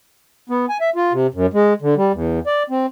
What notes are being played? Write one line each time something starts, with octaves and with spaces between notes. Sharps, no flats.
B3
G#5
E5
F4
C3
F#2
G#3
D3
G3
E2
D5
C4